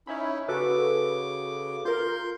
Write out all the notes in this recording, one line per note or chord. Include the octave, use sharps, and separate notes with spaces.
C#4 D#4 E4 C#5 E5 B5
C#3 F#4 A4 B4 D6
F4 A#4 C6 G6